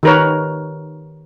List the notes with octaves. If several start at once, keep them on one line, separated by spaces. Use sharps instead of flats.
D#3 G4 A#4 B4 C#5